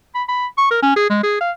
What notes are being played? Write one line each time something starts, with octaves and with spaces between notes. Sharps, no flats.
B5
B5
C#6
A#4
C#4
G#4
G#3
G#4
F5